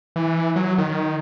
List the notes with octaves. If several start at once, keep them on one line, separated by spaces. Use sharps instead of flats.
E3
F#3
D#3